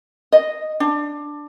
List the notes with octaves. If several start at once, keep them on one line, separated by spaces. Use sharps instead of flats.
D#5
D4